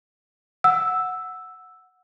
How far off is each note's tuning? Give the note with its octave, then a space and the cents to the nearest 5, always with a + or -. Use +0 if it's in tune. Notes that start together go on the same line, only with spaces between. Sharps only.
F#5 -10 E6 +0